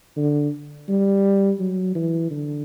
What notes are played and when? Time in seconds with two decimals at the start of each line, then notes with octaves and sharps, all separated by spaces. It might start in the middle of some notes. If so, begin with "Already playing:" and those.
0.17 D3
0.89 G3
1.60 F#3
1.95 E3
2.31 D3